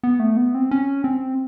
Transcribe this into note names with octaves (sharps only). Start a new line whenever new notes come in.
B3
A3
B3
C4
C#4
C4